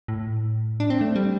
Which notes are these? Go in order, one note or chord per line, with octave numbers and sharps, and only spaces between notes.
A2
D4
C4
A3
G3